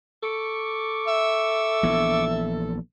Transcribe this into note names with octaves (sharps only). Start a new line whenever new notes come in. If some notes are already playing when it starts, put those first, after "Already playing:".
A4 C#6 D6
E5
A#1 E3 B3